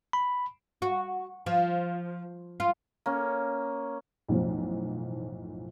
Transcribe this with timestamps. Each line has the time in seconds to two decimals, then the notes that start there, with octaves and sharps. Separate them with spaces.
0.13 B5
0.82 F#4
1.46 F3
2.60 F4
3.06 A#3 C#4
4.29 B1 F#2 A2 E3 F3